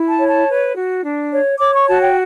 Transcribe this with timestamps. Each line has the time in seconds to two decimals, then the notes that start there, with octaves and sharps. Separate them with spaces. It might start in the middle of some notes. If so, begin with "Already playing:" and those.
Already playing: E4
0.09 A5
0.18 C#5
0.28 A5
0.48 B4
0.75 F#4
1.03 D4
1.32 C#5
1.60 C#5 D6
1.74 C#6
1.87 F#4 A5
2.02 G5